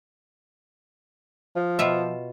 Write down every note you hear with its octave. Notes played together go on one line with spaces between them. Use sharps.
F3
B2 F4 E5